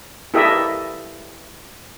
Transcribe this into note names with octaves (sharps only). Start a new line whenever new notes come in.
E4 G4 A4 A#4 D#5 E5